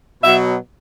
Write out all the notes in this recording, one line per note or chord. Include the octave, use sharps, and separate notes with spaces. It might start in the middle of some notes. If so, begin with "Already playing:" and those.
B2 F#3 E5